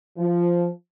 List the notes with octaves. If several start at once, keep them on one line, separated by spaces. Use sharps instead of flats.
F3